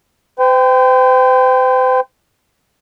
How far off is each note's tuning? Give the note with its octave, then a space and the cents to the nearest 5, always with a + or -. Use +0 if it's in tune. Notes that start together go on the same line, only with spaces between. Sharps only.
C5 -40 G5 +0